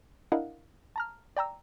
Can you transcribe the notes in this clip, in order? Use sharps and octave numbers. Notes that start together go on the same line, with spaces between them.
D4 E4 A#4 D#5 F5 F#5
A5 A#5 F6
D5 G5 A#5 E6